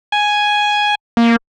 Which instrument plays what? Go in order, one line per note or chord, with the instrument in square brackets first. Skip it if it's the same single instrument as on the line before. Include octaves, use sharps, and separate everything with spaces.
[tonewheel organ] G#5
[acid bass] A#3